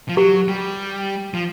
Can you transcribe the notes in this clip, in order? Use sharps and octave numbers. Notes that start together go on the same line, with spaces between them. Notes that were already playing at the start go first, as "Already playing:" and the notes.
F3
F#3 G4
G3
F3